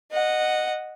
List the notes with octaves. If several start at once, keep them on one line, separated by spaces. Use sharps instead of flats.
D#5 F#5